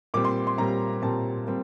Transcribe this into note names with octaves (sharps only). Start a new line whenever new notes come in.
A#2 G3 C4 D6
C6
C6
A#2 G3 C4 A#5
A#2 G3 C4 A5
A#2 G3 C4